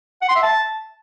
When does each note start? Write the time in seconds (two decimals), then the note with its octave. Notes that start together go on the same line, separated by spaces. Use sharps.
0.22 F#5
0.29 C6
0.36 E5
0.43 A5